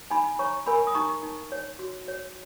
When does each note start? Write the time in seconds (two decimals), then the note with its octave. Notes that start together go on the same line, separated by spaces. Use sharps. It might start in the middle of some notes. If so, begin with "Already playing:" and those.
0.11 D#4 G#5 B5
0.39 C#5 A#5 C#6
0.66 A#4 G#5 B5
0.87 D#6
0.95 D#4 A#5 C#6
1.23 D#4
1.52 C#5
1.79 F#4
2.08 C#5